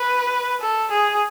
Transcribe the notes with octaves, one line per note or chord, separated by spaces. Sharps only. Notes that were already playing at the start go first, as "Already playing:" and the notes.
Already playing: B4
A4
G#4